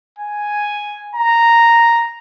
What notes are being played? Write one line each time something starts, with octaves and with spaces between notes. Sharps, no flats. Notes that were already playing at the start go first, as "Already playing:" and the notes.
G#5
A#5